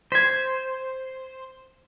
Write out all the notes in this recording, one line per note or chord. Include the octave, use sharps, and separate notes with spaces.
C5 G#6 B6